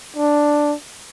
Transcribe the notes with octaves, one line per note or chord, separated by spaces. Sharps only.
D4